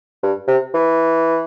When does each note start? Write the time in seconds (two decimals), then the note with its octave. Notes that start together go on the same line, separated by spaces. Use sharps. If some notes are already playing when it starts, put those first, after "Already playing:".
0.23 G2
0.47 C3
0.74 E3